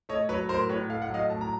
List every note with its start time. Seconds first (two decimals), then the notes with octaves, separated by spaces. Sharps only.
0.09 A3 C#5 D#5
0.29 F#3 B4 C#5
0.49 A2 A#4 C5
0.69 A2 B4 C#5
0.89 A3 F5
1.02 F#5
1.09 F#3
1.14 D#5 F5
1.30 A2 A5
1.41 A#5